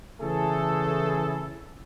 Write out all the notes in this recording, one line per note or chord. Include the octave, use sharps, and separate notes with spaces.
C#3 E3 A3 E4 G#4 A4